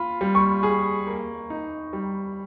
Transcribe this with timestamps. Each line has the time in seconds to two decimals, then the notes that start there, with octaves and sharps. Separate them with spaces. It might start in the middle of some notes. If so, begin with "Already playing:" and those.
Already playing: F4 B5
0.21 G3
0.35 C#6
0.63 G#4
1.07 A#3
1.50 D#4
1.93 G3